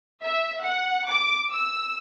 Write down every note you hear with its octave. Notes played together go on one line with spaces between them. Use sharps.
E5
F#5
D6
E6